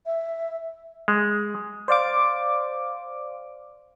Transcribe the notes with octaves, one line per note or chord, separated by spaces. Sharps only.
E5
G#3
C5 D5 F5 D6